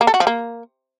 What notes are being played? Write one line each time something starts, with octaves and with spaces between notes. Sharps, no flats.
A#3
A4
F#4
F3
A#3